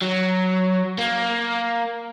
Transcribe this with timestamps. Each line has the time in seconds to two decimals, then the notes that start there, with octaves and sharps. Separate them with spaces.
0.01 F#3
0.98 A#3